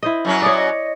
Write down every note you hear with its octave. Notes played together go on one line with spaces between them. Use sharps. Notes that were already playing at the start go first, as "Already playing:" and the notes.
E4 C5 D#5
F#2 F#3 C#4
C#5 D5 D#6
D#5